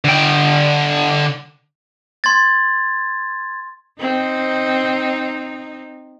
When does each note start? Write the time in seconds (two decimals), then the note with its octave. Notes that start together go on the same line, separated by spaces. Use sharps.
0.05 D3 G5
2.24 C6 G#6 A6
4.00 C4 D#4